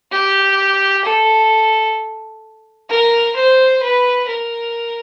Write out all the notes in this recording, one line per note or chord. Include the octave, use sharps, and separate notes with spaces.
G4
A4
A#4
C5
B4
A#4